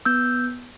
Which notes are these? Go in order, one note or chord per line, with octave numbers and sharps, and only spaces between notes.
B3 E6 G6